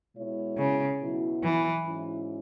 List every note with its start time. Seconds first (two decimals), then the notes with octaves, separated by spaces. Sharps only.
0.16 B2 G#3 E4 C#5
0.58 C#3
1.00 B2 F#3 E4
1.43 E3
1.85 G#2 F#3 C#4 E4